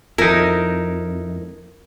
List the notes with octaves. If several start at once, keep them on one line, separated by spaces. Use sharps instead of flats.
F2 D#4 E4 A#4